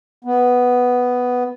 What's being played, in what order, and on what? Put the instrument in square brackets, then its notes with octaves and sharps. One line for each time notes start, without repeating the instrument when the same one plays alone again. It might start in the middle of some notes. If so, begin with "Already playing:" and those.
[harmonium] B3